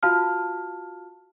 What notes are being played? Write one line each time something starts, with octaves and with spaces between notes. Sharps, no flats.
F4 F#4 F5 A5 F6